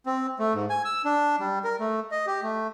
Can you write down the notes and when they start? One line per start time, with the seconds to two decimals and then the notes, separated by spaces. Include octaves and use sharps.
0.06 C4
0.39 A3
0.54 G#2
0.70 G#5
0.85 E6
1.05 D4
1.40 G3
1.64 A#4
1.80 A3
2.11 D#5
2.27 G4
2.43 A3